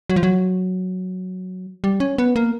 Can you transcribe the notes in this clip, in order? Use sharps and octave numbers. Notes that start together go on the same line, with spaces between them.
F#3
F3
F#3
G3
C#4
B3
A#3